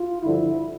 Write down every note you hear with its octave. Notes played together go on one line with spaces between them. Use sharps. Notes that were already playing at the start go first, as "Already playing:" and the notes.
Already playing: F4
G2 D3 F3 E4